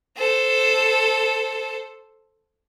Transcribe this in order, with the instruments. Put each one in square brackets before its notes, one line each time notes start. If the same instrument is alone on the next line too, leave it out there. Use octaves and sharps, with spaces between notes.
[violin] A4 C5